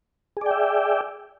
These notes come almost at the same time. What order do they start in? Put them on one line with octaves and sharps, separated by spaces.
G#4 D5 G5 E5